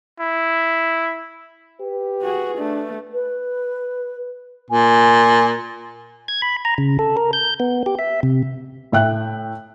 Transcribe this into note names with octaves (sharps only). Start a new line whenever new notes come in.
E4
G4 B4
F#4 G#4
A3 D4
B4
A#2 G#5
G#6
B5
A#5
C#3
A4
A#4
G6
B3
G4
E5
C3
A2 E5 G5 F#6